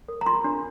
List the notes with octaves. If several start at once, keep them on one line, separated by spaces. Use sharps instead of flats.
A#4
A#5
F4 C6
D4